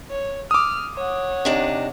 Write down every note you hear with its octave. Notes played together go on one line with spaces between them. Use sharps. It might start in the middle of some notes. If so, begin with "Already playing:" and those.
C#5
D6 D#6 F6
C#5 F#5
C3 D4 D#4